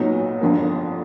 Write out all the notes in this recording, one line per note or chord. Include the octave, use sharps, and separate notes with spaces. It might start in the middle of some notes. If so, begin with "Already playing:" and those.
Already playing: B1 A#2 F#3 B3 D#4
G1 F2 D3 F3 A#3